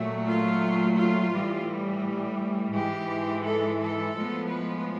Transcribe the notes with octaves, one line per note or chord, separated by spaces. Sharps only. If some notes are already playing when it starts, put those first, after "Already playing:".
Already playing: A#2 F#3 A3
F4
F4
A2 E3 G3
G#2 E3 G#3 G4
A4
A4
A2 F3 G#3 B3
B4